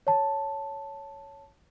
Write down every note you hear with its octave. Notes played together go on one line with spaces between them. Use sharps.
C#5 A5